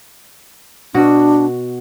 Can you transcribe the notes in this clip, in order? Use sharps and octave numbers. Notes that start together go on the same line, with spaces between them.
B2 D4 F#4